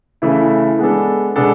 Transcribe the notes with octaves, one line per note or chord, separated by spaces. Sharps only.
C#3 E3 A3 E4
G#3 B3 D4 A4
B2 G#3 B3 D4 A4